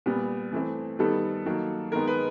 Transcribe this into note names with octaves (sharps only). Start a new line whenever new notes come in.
A#2 G3 B3
E3 A3 C4
D#3 G3 B3 A4
D#3 F#3 A#3
D#3 G#3 B3 A#4
B4